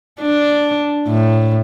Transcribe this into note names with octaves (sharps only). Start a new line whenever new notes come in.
D4
A2